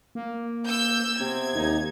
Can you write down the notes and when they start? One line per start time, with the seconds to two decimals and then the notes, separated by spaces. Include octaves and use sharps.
0.15 A#3
0.66 E6 G6
1.20 C3 B3 C4 G#6
1.55 D#2 D#4